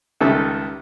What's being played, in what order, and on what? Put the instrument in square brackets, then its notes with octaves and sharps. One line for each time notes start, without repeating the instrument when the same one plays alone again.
[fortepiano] C#2 D#3 G3 A4 E5